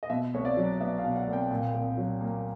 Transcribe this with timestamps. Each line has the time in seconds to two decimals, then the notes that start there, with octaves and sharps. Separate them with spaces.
0.03 D#5
0.10 B2 E5
0.34 C2 C#5
0.45 D5
0.57 F#3
0.80 B3 E5
0.98 F5
1.04 B2
1.16 F#5
1.27 C2
1.33 G5
1.51 A#2
1.74 C2
1.97 F#3
2.21 A#3